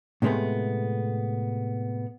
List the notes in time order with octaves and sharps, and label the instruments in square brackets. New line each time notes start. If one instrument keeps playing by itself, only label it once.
[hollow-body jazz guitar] A2 C3 G#3 A3 B3